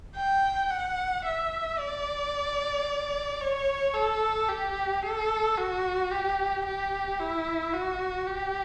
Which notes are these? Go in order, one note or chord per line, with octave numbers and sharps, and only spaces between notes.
G5
F#5
E5
D5
C#5
A4
G4
A4
F#4
G4
G4
E4
F#4
G4